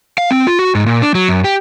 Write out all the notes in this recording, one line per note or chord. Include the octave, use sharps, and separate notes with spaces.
F5
C4
F4
F#4
G#2
A#2
D4
F#3
F#2
G4